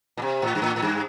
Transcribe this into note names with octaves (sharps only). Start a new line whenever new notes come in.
A#2
C3
A2
G2
A2
A2
G2